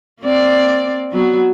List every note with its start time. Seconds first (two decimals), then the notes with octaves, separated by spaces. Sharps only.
0.22 A#3 C4 D5
1.11 F#3 B3 F#4